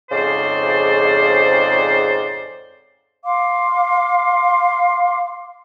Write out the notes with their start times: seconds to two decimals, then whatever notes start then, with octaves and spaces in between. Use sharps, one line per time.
0.10 F2 G#2 C#3 C5 D5
3.25 F5 C6 D6